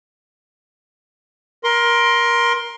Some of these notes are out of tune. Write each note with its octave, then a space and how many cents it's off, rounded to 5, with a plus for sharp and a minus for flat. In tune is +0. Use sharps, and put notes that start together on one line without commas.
A#4 +20 C6 +5